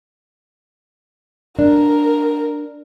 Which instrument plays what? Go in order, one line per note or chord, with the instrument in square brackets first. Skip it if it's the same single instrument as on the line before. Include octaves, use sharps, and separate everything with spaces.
[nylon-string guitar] D4 [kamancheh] A#4